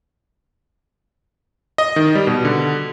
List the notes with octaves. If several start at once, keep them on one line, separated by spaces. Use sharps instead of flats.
D#5
D#3
G3
B2
D3